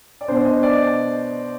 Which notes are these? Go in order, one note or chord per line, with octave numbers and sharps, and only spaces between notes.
D5
B2 B3 D4 C5
D#5
D5